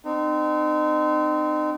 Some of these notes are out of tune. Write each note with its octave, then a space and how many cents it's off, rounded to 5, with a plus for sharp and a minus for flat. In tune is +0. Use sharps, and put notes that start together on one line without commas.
C4 -30 D#4 -35